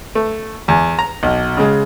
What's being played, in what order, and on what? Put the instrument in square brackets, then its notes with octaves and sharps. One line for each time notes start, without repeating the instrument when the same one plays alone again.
[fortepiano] A3
E2
A#5
[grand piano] B1
C#3 G#3